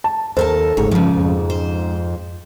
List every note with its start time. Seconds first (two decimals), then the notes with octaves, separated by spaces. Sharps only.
0.04 A5
0.37 D#2 A4 A#4 C5 A5
0.77 F#1 G#2 C#5
0.91 G2 C#3 F3
1.17 F2
1.50 C5